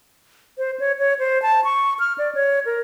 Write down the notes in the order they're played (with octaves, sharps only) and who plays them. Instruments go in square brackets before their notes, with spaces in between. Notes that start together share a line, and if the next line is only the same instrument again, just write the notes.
[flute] C5
C#5
C#5
C5
A5
C#6
F6
D5
C#5
A#4